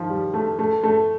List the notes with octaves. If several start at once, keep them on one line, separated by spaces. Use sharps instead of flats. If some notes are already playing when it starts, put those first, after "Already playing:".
Already playing: D#3 F3
G3
A3
A3
A3